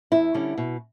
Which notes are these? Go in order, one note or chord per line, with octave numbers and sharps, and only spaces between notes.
E2 E4
D3 G3 C#4
B2